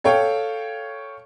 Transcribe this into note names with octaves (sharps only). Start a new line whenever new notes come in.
A4 C#5 F5 G5